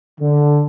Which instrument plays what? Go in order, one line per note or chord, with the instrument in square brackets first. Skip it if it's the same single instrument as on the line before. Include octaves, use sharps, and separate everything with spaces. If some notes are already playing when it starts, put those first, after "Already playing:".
[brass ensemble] D3